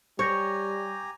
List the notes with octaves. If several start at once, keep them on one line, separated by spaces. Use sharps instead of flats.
G3 G4 C#5 G#5 A#5 C#6 G6 A#6